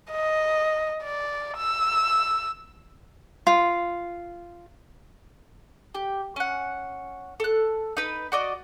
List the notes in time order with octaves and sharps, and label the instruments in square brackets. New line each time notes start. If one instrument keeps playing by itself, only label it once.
[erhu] D#5
D5
E6
[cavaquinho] F4
[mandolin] G4
C#4 F#5
A4 F#6
D#4 B4
F#4 D5 D#5